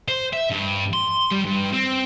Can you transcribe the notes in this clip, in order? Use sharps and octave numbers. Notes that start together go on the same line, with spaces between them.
C5
E5
G2
C6
G3
G2
C4